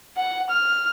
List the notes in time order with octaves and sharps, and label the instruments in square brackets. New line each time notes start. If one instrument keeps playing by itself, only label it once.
[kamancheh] F#5
F6